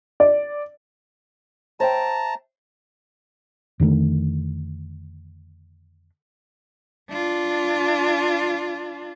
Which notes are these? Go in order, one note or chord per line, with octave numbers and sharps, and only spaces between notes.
D5
C5 E5 G5 A5 A#5
F2 D3 D#3 A3
D4 F4